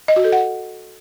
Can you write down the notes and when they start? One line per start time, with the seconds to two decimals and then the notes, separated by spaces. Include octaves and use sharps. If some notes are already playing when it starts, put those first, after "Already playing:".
0.08 D#5
0.16 F#4
0.24 A4
0.32 F#5